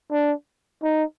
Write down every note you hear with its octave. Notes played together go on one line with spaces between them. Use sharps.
D4
D#4